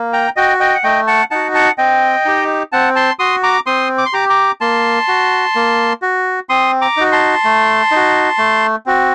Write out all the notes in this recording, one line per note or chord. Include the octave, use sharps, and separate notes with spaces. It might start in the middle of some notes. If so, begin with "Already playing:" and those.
Already playing: A#3
G5 A#5
F#4 D#5 G5
D#5 G5
F#5
A3 D#5 G5
F#5 A5
D#4 F#4 F#5 A5
F#5 A5
C4 D#5 G5
D#4 G4
C4 F#5 A5
A5 C6
F#4 C6 D#6
A#5 D6
C4 C6 D#6
D6
C6
G4 A#5 D6
A#5 D6
A#3 A5 C6
F#4
A#3
F#4
C4 C6 D#6
A#5 D6
D#4 F#4
A5 C6
A3
D#4 F#4
A3
C4 F#4